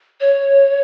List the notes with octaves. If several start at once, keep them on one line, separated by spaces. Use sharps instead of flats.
C#5